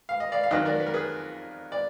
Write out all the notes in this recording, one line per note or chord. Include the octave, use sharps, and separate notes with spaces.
F5
D#5
D5 F5
F5
F2 D#3 F#3 B4 D#5
A#4 D5
B4
A#4
G#4 B4
D5